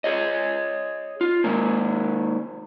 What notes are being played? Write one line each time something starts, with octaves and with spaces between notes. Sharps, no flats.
G#4 C#5 D#5
F4
D#3 G#3 A#3